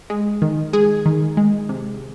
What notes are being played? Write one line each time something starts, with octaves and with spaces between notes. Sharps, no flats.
G#3
D#3
G#3 G#4
D#3
G#3
C3